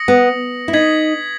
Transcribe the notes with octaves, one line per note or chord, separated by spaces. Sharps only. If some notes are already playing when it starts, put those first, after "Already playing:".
Already playing: D#6 A#6 C#7 F#7
B3
E4
D#4 G#6 B6 F#7